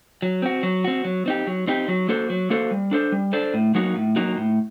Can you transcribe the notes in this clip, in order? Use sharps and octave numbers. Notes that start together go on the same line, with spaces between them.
F#3
C4 F#4
F#3
C4 F#4
F#3
C4 D#4 G4
F#3
C4 D#4 G4
F#3
A#3 F#4 A4 C5
F#3
A#3 F#4 A4 C5
G3
D4 A4 C5
G3
D4 A4 C5
A2
F#3 A#3 D#4 F#4
A2
F#3 A#3 D#4 F#4
A2